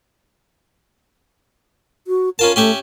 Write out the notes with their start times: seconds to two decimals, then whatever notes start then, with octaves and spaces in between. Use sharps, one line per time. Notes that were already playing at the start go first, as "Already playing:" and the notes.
2.07 F#4
2.39 C#4 F4 A#4 A5
2.56 A3 C#4 G4 E5